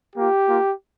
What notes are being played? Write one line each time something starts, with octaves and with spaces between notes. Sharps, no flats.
A#3 F4 G4
A#3 F4